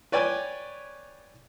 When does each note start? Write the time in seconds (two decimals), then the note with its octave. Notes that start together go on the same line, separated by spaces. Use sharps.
0.12 B4 C#5 D5 G5 G#5